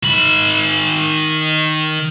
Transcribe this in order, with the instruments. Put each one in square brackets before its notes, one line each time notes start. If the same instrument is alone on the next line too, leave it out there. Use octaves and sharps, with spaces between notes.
[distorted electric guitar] D#3 B5